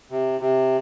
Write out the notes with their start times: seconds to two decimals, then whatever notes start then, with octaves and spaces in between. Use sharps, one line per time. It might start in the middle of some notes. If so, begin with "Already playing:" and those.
0.11 C3
0.40 C3